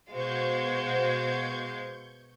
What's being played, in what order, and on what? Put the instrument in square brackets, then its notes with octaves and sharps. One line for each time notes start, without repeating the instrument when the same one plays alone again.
[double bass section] B2 [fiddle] G#3 F5 [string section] F#4 C5 [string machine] C#6 G6 G#6